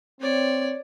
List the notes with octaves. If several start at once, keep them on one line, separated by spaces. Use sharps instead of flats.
C4 C#5 D5